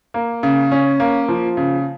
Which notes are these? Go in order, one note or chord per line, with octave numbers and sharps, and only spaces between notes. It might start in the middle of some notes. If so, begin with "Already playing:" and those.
A#3
C#3
C#4
A#3
F3
C#3